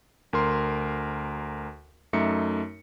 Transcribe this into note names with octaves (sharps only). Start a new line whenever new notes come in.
D2 A#4 C6
F#2 A3 D#4 E5 C#7